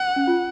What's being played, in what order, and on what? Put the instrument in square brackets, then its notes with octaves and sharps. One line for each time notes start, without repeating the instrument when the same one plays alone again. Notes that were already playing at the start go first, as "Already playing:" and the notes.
Already playing: [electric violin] F#5
[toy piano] C#4
F4